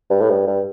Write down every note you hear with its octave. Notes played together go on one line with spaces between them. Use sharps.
G2
A2
G2
G2